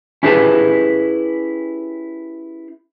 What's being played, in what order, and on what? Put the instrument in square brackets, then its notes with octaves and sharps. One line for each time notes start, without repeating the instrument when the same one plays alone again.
[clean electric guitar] C#4 E4 G4 G#4 B4 A5